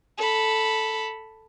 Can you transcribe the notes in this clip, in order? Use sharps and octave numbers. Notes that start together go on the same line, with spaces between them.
A4 B5